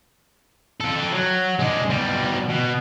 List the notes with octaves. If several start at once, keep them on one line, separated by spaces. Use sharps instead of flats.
C4 A4
F#3
G#3 D4
B2 G3
B2